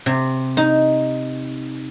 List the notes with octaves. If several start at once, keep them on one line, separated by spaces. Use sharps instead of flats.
C3
D#4